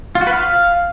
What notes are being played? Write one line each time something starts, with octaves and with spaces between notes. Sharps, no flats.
F4
F#4
B4
F5